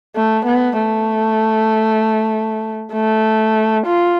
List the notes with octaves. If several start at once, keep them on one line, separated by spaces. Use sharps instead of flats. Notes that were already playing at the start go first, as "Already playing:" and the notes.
A3
B3
A3
A3
F4